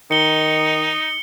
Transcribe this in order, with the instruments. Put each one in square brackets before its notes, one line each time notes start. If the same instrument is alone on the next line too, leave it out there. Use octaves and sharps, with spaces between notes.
[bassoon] D#3 [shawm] D#4 [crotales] C#7 G7